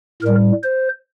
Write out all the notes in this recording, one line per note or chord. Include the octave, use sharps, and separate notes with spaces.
A2 G3 A#4
C5